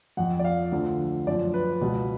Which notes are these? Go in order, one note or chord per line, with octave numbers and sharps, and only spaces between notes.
F2 F3 F#5
D5
F5
D2 D3 F3
F#2 F3 D5
B4
C#2 B2